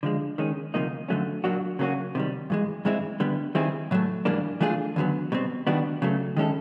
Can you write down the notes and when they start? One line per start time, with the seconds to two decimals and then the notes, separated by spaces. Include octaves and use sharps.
0.03 D3 F3 G#3
0.38 D#3 G#3 C#4
0.74 D2 C3 F3 A#3 D#4
1.08 F2 D3 F#3 A3 C#4
1.44 A#2 F#3 A#3 D4 F#4
1.79 C#3 F#3 A#3 C#4 F#4
2.15 C3 D#3 G3
2.50 G2 E3 G#3
2.85 G2 E3 G#3 C4 E4
3.20 D3 G3 B3
3.55 D#3 G3 C4 E4 G#4
3.91 A2 F#3 A3
4.25 G#2 E3 G3 A#3 D4
4.61 E3 A3 D4 F4 G#4
4.96 D#2 D3 F#3 B3
5.32 B2 G3 C4
5.67 D#3 G3 B3 D4 F#4
6.02 C#3 F#3 A3
6.37 D#3 G#3 C#4 E4 A4